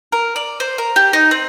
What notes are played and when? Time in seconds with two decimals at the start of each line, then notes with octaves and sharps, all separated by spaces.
0.12 A#4
0.36 D5
0.60 C5
0.78 A#4
0.96 G4
1.13 D#4
1.31 C4